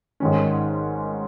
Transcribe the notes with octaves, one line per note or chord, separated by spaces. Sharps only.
G#1 G#2 D#3 C#4